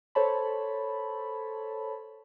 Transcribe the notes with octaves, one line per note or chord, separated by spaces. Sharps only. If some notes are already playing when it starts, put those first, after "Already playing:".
A4 C5 C#5 A5 B5